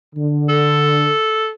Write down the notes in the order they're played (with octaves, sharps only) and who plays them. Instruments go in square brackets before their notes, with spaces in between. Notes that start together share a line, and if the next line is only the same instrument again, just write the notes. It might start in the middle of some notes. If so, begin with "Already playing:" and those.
[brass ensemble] D3
[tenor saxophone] A4